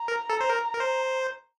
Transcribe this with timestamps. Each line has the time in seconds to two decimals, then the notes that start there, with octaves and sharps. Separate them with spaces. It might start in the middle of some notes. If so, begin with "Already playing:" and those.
Already playing: A#5
0.08 A#4
0.30 A4
0.40 C5
0.49 A#4
0.74 A#4
0.80 C5